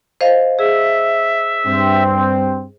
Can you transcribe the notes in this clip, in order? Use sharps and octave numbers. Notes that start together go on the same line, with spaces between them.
C5 D#5 F5
G#4 E5
G2 C4